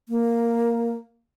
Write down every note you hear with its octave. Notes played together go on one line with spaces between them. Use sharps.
A#3